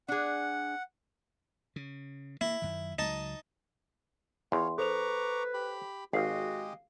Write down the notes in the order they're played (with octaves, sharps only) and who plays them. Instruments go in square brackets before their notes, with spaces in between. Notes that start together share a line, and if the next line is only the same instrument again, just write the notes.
[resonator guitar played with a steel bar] D4 G#4 [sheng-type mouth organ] F#5
[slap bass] C#3
[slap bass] A#3 [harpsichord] E4
[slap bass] F#2 D#3
[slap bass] C#2 F#3 [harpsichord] D#4 A5
[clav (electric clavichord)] E2 [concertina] F4 C#5 F5 [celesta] C6
[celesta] A4 C5 F7 [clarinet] B4 [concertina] A#5 C#6 D6
[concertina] G4 B5
[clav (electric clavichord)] G#1 [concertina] G#3 G4 D#5 [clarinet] F#4 [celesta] F5 C7